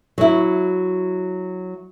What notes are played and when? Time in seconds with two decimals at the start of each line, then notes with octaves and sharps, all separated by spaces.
0.18 F#3 E4